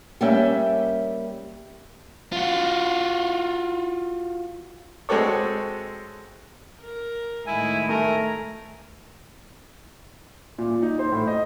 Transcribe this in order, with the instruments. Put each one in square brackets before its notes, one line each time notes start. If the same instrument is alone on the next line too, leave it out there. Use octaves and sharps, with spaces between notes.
[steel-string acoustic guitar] G3 A#3 C#4 E5 G5
[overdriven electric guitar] F4 F#4
[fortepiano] G#3 C4 F#4 A4 C#5
[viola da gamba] A#4
[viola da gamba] A2 D#3 G#3 [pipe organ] E4 [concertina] G#5
[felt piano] A3 [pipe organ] A#4 [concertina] G#5
[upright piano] A#2
A#2
D#4
C5
A2
D#5